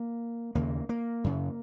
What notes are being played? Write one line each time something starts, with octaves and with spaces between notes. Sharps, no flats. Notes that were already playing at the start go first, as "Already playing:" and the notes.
Already playing: A#3
D#2 C#3 A#3
A#3
F#2 C#3